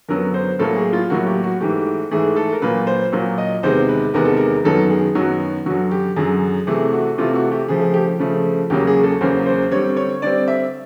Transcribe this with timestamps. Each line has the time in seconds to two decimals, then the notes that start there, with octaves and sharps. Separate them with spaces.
0.09 F#2 D3 F#3 B3 A#4
0.34 C5
0.59 A2 F#3 A#3 A4
0.76 G#4
0.93 F4
1.10 A2 F#3 A#3 F#4
1.27 G4
1.43 F#4
1.61 G#2 E3 A3 G4
2.11 G#2 E3 A3 G#4
2.36 A4
2.53 A#4
2.62 A#2 F#3 A#3 B4
2.87 C5
3.12 A#2 F#3 A#3
3.38 D#5
3.63 E2 C3 D#3 G#3 B3 C5
3.88 B4
4.14 E2 C3 D#3 G#3 B3 A#4
4.25 A4
4.37 A#4
4.64 F#2 D#3 F#3 B3 A4
4.90 G#4
5.15 F#2 D#3 F#3 B3 F#4
5.66 F#2 D3 F#3 F#4
5.91 G4
6.16 F#2 D3 F#3 G#4
6.67 C3 E3 A3 G#4
6.93 F#4
7.18 C3 E3 A3 F4
7.35 F#4
7.52 G4
7.68 C#3 F3 A3 G#4
7.82 G#4
7.94 G4
8.19 C#3 F3 A3
8.70 E2 C#3 F#3 A#3 C#4 G4
8.87 G#4
9.03 A4
9.21 E2 C#3 F#3 A#3 C#4 C5
9.46 C5
9.72 D3 G3 C4 C#5
9.97 C#5
10.22 D3 G3 C4 D5
10.48 E5